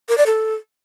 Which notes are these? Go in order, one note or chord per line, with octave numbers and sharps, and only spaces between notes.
A#4
D5
A4